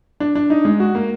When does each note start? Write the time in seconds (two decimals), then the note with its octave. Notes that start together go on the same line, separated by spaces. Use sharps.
0.20 D4
0.35 D4
0.50 D#4
0.65 G#3
0.80 F#4
0.95 A#3